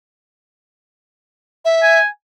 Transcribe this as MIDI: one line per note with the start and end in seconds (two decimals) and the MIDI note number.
1.65 1.99 76
1.82 2.06 80